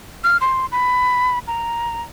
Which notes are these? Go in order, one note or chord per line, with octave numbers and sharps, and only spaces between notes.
F6
C6
B5
A#5